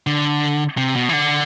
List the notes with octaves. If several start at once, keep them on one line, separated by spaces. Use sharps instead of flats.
D3
C3
B2
E3
D3